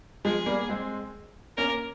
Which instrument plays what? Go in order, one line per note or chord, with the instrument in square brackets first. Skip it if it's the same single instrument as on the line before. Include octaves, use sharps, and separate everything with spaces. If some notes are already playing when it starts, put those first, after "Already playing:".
[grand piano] F3 G#3 [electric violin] G#4
[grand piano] G3 A#3
G#3 C4
[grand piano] A#3 C#4 [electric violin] A#4